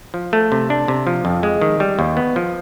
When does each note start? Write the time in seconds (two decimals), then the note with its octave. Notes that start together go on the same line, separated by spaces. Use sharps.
0.14 F3
0.33 A3
0.52 C3
0.70 D4
0.88 C3
1.07 F3
1.25 F2
1.43 G#3
1.61 D#3
1.80 G3
1.99 D#2
2.17 B3
2.36 F3